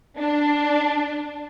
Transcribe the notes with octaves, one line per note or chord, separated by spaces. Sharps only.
D4